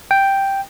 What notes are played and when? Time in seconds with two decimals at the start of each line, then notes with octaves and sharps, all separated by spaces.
0.11 G5